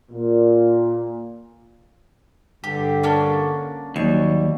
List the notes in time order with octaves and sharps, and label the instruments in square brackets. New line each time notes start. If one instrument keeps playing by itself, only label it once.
[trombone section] A#2
[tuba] G2 [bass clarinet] D3 [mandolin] G4
[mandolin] A#3 C#4 D4
[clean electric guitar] D#2 [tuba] F#3 [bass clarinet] G3 [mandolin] C#6